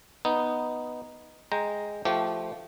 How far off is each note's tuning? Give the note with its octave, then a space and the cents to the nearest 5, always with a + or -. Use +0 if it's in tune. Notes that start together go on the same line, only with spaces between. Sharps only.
B3 +0 D#4 +0
G#3 +0 G5 +10 A#5 +0
F3 -15 A3 +0 G4 -25